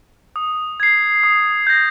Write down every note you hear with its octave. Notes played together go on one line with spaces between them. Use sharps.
D#6
G#6 C7
D#6
G6 A#6